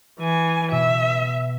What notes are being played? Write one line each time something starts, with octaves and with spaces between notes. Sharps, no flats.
E3 G#5
B2 E5